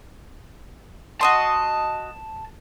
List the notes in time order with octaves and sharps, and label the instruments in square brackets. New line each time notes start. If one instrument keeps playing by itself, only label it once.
[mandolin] F#4 D#5 C6 [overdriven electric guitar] A5